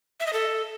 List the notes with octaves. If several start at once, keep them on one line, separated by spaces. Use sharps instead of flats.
E5
D#5
A4